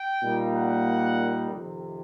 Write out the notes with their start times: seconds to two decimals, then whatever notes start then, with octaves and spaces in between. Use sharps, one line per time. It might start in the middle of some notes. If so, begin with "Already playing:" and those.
Already playing: G5
0.22 A#2 G3 A#3 D#4
0.55 F#5
1.52 F2 C3 D#3